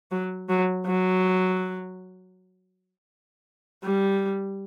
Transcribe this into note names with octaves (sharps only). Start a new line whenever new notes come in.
F#3
F#3
F#3
G3